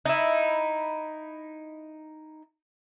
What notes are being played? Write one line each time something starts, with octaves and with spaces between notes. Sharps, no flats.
D#4 E4